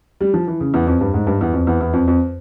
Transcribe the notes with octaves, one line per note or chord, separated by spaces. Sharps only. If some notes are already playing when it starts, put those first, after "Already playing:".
G3
F3
E3
C#3
E2
F2
G2
G#2
G2
E2
F2
E2
E2
F2
F2